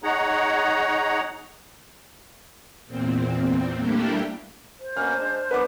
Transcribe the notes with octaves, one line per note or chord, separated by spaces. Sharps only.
D#4 G#4 C#5 F#5 A#5
E2 A#2 C4
G3 A3 A#3 D4 E4 G4
C5
B2 A#3 C#4 F6
G#3 D4
B3 D4 B4 D6